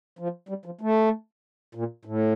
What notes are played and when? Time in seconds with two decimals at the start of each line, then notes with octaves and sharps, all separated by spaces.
0.19 F3
0.49 G3
0.65 F3
0.81 A3
1.75 A#2
2.05 A2